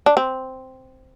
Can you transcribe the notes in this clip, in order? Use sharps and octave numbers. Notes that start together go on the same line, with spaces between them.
D4
C4